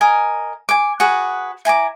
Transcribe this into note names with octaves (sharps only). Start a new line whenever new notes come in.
A#4 D#5 G#5
G#5 D6
F#4 G#4 B4
E4 G#5 A#5 D6